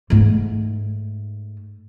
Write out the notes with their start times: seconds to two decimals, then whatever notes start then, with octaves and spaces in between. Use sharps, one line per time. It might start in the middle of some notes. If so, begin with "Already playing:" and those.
0.10 G#2 A3